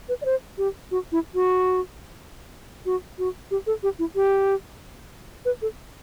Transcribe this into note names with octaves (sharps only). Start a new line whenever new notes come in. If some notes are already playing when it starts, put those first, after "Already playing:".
B4
D5
C5
G4
F#4
E4
F#4
F#4
F#4
G4
A4
G4
E4
G4
B4
A4